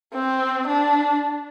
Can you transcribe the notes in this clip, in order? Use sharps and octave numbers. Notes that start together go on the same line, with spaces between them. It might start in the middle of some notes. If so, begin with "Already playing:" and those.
C4
D4